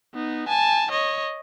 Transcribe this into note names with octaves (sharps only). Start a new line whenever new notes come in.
B3 D#4
G#5 A5
C#5 D#5